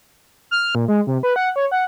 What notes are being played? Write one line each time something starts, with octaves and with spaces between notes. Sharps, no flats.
F6
A#2
G#3
C3
B4
F#5
C#5
F#5